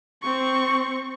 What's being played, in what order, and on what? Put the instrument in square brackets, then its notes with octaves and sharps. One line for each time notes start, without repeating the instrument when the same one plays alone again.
[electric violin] C4 C#6